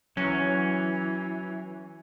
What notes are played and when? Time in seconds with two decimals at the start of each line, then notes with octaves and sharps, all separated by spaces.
0.17 E3 F#3 C#4